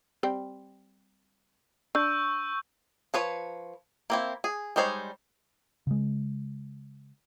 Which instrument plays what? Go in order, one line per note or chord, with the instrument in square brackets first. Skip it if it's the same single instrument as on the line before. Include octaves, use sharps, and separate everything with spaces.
[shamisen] G3 C4 G5
[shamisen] D4 [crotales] C#6 E6 G6
[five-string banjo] F3 B4 C#5
A#3 C4 E4
G#4
G3 G#3 D#4 C5 C#5
[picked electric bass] C#3 G#3